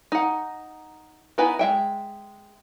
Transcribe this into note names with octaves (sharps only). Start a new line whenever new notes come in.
D#4 F#5
B3 D#4 E4 B4 G#5
G#3 E5 G5